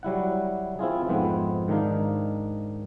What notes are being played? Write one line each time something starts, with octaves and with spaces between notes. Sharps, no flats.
F#3 G3 E4 F#5
C4 E4 F4 G#4
F2 G#2 B3 C4
G#2 D#3 D4 D#4 F5